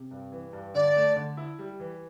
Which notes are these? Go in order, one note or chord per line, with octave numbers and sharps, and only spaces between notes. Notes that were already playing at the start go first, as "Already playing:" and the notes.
Already playing: C3
G2
E3
G2
D3 D5
A3
D3
E4
G3
E3